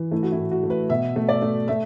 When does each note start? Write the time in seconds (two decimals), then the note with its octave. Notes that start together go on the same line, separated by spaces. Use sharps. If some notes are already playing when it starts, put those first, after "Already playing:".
Already playing: E3
0.11 A3 E4
0.23 F#4
0.32 E4
0.37 A2
0.51 F#4
0.63 A3
0.70 B4
0.90 B2 E5
1.16 A3
1.29 D5
1.42 A3
1.68 A3 E5